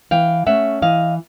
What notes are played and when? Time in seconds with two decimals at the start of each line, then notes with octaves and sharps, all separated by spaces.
0.11 E3 F5 G5
0.46 A3 C#4 E5 F#5
0.82 E3 D#5 F5